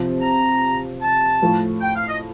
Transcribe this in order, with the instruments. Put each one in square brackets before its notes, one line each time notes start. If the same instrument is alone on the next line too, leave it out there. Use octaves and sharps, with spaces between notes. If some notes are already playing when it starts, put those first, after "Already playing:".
Already playing: [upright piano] C3 F3 C4
[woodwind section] A#5
A5
[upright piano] A2 F3 A3
[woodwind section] G5
F5
D#5